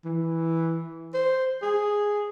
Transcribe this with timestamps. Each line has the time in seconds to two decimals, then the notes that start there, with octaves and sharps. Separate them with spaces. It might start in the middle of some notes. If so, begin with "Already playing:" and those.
0.04 E3
1.14 C5
1.62 G#4